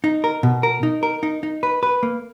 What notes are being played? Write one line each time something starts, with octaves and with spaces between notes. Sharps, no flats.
D#4
A#4
B2
A#4
D#4
A#4
D#4
D#4
B4
B4
A#3